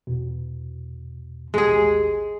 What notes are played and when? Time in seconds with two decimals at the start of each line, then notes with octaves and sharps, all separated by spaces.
0.07 E2 B2
1.54 A1 D#2 G#3 G4 G#4